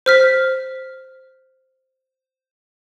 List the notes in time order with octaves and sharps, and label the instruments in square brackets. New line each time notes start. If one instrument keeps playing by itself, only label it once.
[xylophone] C5 F6 B6